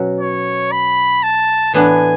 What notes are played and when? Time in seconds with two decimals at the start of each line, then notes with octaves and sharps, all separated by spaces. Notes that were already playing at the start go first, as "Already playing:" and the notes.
Already playing: B2 F#3 C#4 F#4
0.20 C#5
0.72 B5
1.23 A5
1.73 A2 E3 B3 D4 G#5